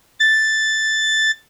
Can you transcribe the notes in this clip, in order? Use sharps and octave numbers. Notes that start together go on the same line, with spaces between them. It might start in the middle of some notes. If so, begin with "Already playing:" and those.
A6